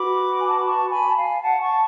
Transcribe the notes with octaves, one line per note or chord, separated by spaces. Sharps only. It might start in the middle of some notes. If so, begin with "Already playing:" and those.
Already playing: F#4 B4 B5 D6
G#5
A5
B5
A5 C#6
G#5 B5
A5
F5 G#5
F#5 A5
A5 C#6